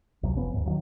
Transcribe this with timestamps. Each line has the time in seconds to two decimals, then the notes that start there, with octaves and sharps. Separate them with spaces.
0.23 C#2 C3 F#3
0.37 F1 F3 B3 C#4
0.54 D#2 G#2
0.65 D#3 F3 F#3